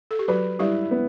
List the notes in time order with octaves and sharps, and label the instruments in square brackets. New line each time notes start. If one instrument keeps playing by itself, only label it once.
[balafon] A4
G4
[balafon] F#3 F#4 [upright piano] B4
[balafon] G3 G4 [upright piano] E4
[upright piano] B3